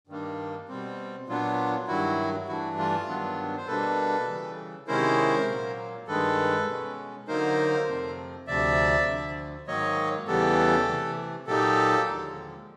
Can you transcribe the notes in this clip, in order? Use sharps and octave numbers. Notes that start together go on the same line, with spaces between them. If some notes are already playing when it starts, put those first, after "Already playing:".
G2 D#3 G3 A#3 D4
B2 G3 C4
A#2 F#3 B3 D4 F4
G2 D#3 F#3 E4 F#4
G2 E3 A3 D4 E4 F#4
F4
G2 D#3 F#3 B3 D4
C5
B2 G3 A#3 D4 A4 B4
C#3 E3 G3
C3 D#3 G#3 C#4 E4 A#4 C5
A#2 F#3 A#3
G2 D#3 G#3 A4 B4
B2 G#3 C#4
D3 F#3 A#3 D#4 A#4 C5
F2 C3 F3 A3 C4
D2 C3 F3 D5 E5
D2 D3 F3
G#2 D#3 F#3 A#3 C#5 D#5
E2 C#3 E3 G3 B3 G4 A4
C3 E3 A3
A#2 F#3 A#3 D#4 G4 A4
D#2 D3 F3 G#3